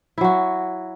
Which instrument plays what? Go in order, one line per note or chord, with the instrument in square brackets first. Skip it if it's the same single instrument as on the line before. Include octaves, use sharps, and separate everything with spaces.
[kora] E4
F#3
F#4